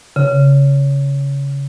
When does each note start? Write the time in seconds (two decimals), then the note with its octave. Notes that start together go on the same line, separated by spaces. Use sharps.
0.16 C#3